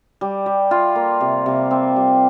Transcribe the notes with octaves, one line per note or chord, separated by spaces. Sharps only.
G3
G3
F4
A#3
C3
C3
C4
G3